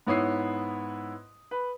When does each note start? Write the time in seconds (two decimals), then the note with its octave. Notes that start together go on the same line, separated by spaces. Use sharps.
0.07 G#2 B3 E4 C#5 D#6 C7
1.51 B4